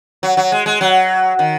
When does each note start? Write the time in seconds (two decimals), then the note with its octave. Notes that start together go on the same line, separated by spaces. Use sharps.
0.23 F#3
0.37 F#3
0.52 G#3
0.66 G#3
0.81 F#3
1.39 D#3